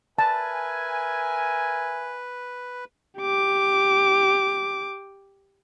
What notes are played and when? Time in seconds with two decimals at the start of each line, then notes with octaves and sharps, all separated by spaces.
0.18 A#4 B4 E5 G#5 A5
3.19 G4 D6